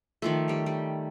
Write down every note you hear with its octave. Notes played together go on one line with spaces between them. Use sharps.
D#3 F3 A3
G3 C#5
G3